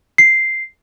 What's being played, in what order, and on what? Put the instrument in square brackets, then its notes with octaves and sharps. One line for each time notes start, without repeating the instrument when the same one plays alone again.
[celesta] C7